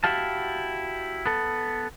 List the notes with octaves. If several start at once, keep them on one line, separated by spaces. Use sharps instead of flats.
E4 F#4 G4 F5 A5
B3 A4